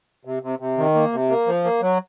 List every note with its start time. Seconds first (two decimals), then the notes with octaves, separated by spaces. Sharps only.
0.25 C3
0.43 C3
0.59 C3
0.78 D#3
0.94 A#3
1.13 C3
1.29 A#3
1.47 F3
1.64 A#3
1.81 F#3